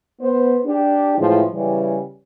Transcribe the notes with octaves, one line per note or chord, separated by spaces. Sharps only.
B3 C5
D4 G4
A2 E3 F3 G#3
C#3 E3 G3